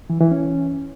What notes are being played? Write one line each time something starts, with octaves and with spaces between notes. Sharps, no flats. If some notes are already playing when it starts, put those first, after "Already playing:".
E3
E3
C#4